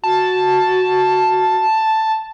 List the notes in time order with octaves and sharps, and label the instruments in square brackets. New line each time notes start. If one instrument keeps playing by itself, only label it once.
[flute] F#4 [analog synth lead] A5